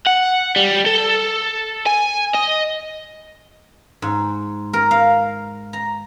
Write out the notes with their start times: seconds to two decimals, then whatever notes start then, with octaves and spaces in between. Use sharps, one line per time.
0.07 F#5
0.56 G3
0.86 A4
1.86 G#5
2.34 D#5
4.02 G#2
4.73 A#4
4.91 F5
5.73 A#5